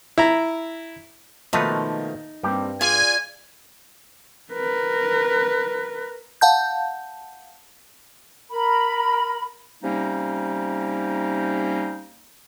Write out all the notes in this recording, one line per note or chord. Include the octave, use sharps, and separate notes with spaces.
E4 A#5
B2 D#3 F3 A3 A#3 D#4 B4 A5
G2 G3 A#3 C4 G4
F4 G#4 D5 G#5
A#4 B4
F5 F#5 A5 G6
A#4 B5
C3 G3 A#3 C#4 D#4